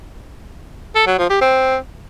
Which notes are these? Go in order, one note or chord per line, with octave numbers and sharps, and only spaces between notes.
A4
F#3
F3
G4
C4